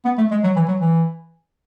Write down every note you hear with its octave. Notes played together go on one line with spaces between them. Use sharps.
B3
A3
G#3
F#3
E3
F#3
E3